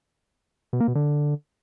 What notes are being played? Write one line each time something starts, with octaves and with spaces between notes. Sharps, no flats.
B2
A#3
B2
D3